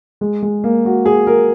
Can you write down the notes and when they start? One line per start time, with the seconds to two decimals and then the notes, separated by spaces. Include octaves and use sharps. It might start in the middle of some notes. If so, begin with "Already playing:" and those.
0.21 G#3
0.42 G#3
0.64 A#3
0.85 F#4
1.06 G#4
1.27 A#4